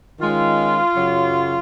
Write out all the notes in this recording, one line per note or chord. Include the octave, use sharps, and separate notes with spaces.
D#3 G#3 C#4 F4
F#2 C#3 F#3